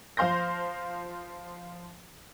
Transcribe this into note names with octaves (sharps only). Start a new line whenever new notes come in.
F3 C5 F5 C6 G6 A#6